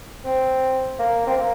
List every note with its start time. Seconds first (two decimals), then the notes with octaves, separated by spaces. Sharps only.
0.25 C4
0.99 A#3
1.27 C4
1.37 A#3